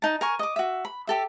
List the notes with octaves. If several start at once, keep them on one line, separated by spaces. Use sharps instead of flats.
D#4 A5
A#4 G#5 C#6
D#5 D6
F#4 E5
B5
G4 A4 E5